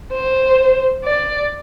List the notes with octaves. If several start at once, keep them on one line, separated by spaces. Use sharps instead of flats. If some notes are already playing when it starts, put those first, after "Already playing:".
C5
D5